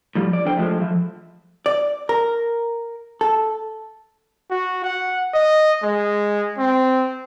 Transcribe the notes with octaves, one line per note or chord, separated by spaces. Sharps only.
A2 F3 G3
D5
F2 D3 C5 G5
F3 G#3 A3
F3 E5
D5
A#4
A4
F#4
F#5
D#5
G#3
C4